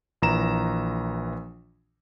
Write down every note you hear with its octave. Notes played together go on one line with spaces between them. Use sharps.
A#1 E3 A#5 E7